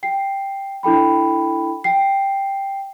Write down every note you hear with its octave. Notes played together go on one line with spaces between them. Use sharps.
G5 C7
D4 E4 A4 G5 B5
G5 C7